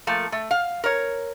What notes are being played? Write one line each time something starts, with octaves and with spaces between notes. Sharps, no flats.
F3 A3 A#3
A3
F5
A#4 C#5